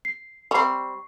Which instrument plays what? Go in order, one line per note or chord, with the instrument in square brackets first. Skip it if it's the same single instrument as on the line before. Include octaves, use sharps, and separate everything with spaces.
[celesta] C7
[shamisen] G3 C4 [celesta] C#6 C7